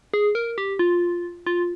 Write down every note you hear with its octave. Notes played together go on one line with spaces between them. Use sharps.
G#4
A#4
G4
F4
F4